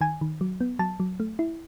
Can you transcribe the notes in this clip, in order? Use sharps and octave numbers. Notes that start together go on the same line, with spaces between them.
D#3 G#5
D#3
F#3
B3
F#3 A5
F#3
A3
E4